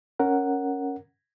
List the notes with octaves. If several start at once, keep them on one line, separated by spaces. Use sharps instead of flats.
C#4 A#4 F#5